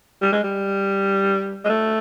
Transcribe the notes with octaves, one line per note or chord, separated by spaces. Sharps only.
G3
G#3
G3
G#3
A3